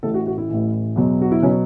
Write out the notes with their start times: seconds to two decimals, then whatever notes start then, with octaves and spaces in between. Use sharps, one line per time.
0.03 A1 A2 E3 A4
0.14 F#4
0.27 F#4
0.38 E4
0.49 A1 A2 E3
0.96 E2 B2 F#3
1.21 F#4
1.32 E4
1.43 B2 F#3 C#4